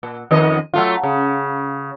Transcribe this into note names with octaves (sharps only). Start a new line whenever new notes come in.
A#2
F2 D#3 D#5
F#3 A3 F4
C#3